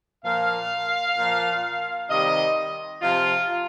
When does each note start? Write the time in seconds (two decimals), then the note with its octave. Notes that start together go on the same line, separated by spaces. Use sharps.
0.24 A#2 F3 F5
1.17 A#2 F3
2.09 C3 D#3 G3 D#5
3.01 C3 F3 F4